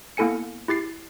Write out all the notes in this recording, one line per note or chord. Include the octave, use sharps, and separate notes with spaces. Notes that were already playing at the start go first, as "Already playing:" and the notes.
A#3 B3 E4 A4 G#5 C#7
E4 G4 A6 C7